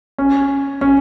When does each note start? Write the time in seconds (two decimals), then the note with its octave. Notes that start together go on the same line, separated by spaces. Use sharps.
0.18 C#4
0.81 C#4